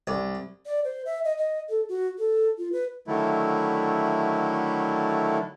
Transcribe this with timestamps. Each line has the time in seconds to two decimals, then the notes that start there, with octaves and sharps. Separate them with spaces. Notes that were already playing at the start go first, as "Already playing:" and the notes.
0.07 C2
0.66 D5
0.84 C5
1.06 E5
1.25 D#5
1.38 D#5
1.69 A4
1.89 F#4
2.18 A4
2.58 F4
2.72 B4
3.07 D3 D#3 F#3 A3 E4